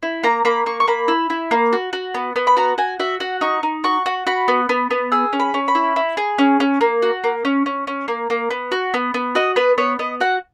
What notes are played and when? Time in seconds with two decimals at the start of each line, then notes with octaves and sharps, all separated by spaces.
0.03 E4
0.23 A#3 A#5
0.45 A#3 B5
0.66 A#3 C#6
0.80 C#6
0.88 A#3 B5
1.08 E4
1.30 E4
1.51 A#3
1.73 F#4
1.93 F#4
2.14 B3
2.36 B3
2.47 B5
2.57 F#4 A#5
2.78 F#4 G#5
3.00 F#4 E5
3.20 F#4 F#5
3.41 D#4 C#6
3.63 D#4
3.84 F#4 C#6
4.06 F#4
4.27 F#4 B5
4.48 B3
4.69 B3
4.91 B3
5.12 G#4 E6
5.33 C#4
5.40 B5
5.54 C#4
5.68 B5
5.75 E4
5.96 E4
6.17 G#4
6.38 C#4
6.60 C#4
6.81 A#3
7.02 F#4
7.24 A#3
7.45 C#4
7.66 C#4
7.87 C#4
8.08 A#3
8.30 A#3
8.50 B3
8.72 F#4
8.94 B3
9.14 B3
9.35 F#4 D#5
9.56 B3 B4
9.78 B3 C#5
9.99 B3 D#5
10.20 F#4 F#5